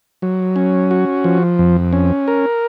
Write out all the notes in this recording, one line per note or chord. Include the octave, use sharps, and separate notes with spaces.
F#3
C#4
F#4
F3
F2
C#4
A#4